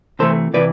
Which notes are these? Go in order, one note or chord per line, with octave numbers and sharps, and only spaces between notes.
C3 E3 A3 A4 C5
C3 E3 B4 D5